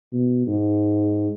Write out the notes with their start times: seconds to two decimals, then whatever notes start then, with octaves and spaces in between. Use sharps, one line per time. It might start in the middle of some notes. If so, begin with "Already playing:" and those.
0.13 B2
0.47 G#2